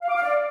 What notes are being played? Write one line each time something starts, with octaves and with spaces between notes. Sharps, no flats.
F5
D6
F5
D5